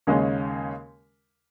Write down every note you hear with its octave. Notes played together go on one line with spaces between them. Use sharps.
D#2 C#3 G#3 C#4